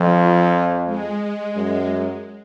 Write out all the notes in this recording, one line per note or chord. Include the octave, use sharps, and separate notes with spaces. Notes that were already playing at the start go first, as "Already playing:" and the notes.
Already playing: F2 F3
G#3
F#2